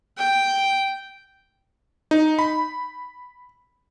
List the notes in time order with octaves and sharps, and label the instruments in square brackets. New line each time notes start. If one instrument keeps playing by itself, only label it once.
[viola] G5
[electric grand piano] D#4
B5